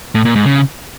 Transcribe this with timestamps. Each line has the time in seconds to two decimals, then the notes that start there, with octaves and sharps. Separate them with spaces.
0.15 A2
0.25 A#2
0.35 G#2
0.46 C#3